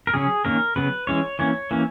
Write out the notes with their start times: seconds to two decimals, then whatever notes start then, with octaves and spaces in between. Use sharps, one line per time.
0.07 A#4
0.14 C#3 F#3 C#4 G#4
0.45 D#3 A#3 C#4 A#4
0.76 C#3 F#3 B3 B4
1.07 E3 G#3 C#4 C#5
1.39 E3 A#3 C#4 C#5
1.71 E3 A#3 C#4